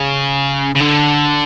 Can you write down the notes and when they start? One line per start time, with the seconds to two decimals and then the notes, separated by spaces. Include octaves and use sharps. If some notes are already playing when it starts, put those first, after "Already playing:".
Already playing: C#3
0.75 C#3
0.80 D3